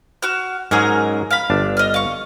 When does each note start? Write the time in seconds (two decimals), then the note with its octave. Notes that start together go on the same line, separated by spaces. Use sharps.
0.22 F#4 F6
0.71 G#2 F#3 C#4 D#4 G#4 A#4
1.31 F5 B5
1.50 G1 D4
1.77 D#5 F6
1.94 F5 C#6